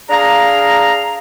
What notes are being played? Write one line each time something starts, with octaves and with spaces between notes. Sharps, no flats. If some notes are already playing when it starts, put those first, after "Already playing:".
D4 G#4 F5 A#5